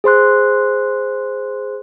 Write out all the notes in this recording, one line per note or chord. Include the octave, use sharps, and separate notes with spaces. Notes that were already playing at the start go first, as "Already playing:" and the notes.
G#4 C5 C6 F#6